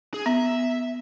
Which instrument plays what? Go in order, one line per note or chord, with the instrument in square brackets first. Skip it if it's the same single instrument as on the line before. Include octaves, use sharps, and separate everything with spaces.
[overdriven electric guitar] G#4
[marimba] B3 [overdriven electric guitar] E5